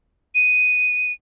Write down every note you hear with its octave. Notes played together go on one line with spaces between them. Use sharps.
D#7